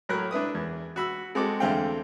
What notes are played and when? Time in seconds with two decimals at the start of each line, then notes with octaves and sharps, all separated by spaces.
0.09 A2 F#3 A#4 B5 F#6
0.31 D4 E4 B4 D#6
0.55 E2
0.96 F#4 B5 E6
1.35 G#3 C4 F#4 A4 D6
1.60 E2 D3 A3 C4 F5 G5